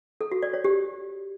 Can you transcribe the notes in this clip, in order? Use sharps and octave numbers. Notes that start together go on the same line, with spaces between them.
A4
F#4
D5
C#5
G4